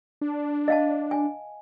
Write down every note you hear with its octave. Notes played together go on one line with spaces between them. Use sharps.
D4
D#5 F5 A5
G#5